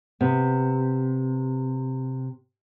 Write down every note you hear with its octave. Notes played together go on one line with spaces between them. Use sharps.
C3 B3